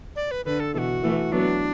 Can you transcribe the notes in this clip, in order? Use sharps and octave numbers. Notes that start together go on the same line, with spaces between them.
D5
B4
D3 B4
A4
B2 E3 A4
F#4
E3 A3
F#3 B3 D4